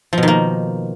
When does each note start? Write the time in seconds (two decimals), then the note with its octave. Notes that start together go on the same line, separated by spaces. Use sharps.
0.13 F3
0.18 B2
0.23 D#3
0.28 A#3